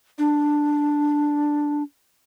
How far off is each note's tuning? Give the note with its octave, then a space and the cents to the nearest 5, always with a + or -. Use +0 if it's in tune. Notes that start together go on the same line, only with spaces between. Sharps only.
D4 +5